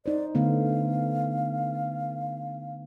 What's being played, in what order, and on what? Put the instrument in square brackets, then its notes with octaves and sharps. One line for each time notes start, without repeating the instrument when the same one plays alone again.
[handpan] D#4 C5 [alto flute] D5
[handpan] D3 A3 B3 [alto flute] F5